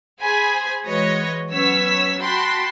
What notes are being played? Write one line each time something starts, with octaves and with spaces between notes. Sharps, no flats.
G#4 C5 G#5 B5
E3 G#3 F#4 B4 C#5 D#5
F#3 B3 C#4 C#5 E6 B6
F#4 G5 A5 B5 C6